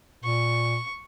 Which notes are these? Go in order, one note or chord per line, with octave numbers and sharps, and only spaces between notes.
A#2 C#6